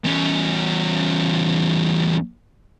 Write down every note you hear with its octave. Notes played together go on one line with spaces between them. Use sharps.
E2 C#4